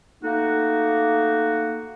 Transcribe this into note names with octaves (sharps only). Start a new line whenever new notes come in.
A3 A#3 D#4 F#4